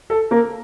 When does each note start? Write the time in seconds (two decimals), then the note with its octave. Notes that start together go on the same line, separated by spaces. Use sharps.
0.10 A4
0.31 A#3 A#4